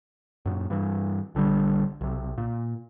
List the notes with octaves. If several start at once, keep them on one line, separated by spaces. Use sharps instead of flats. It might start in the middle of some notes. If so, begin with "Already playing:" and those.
F#2 A#2
G2 E3
A#1 D3 D#3 G3
B1 C3
A#2